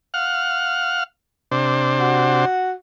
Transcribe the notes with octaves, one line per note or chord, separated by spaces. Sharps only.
F5 F#5 F6
C3 D4 C5
F#4